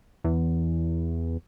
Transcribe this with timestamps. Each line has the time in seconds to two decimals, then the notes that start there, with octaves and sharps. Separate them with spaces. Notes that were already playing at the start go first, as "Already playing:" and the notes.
0.24 E2